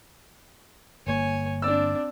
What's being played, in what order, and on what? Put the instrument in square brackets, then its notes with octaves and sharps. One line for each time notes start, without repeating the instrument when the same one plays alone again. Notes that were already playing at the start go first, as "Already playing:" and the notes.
[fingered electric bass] G1 A#3 [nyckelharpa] C#5 G#5
[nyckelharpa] C4 D4 [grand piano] D5 E6